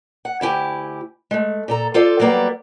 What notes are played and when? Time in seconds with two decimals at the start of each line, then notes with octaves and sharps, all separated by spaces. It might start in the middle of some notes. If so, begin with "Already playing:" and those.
0.25 F#5
0.41 D2 E4 G4 G#5
1.31 G#3 A3
1.68 A#2 A4 A#5
1.94 F4 A4 C5 D5
2.20 F#3 G3 A#3 B3 D5